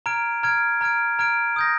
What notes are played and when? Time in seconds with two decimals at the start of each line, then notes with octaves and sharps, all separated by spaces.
0.06 A#5 F6 G#6 D7
0.43 A#5 F6 G#6 D7
0.81 A#5 F6 G#6 D7
1.19 A#5 F6 G#6 D7
1.56 D#6 G6 A#6